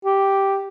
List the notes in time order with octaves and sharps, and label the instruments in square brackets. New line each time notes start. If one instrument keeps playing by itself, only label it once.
[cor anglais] G4